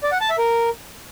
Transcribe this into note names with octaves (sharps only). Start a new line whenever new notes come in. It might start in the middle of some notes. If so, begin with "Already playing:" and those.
D5
F#5
A5
E5
A#4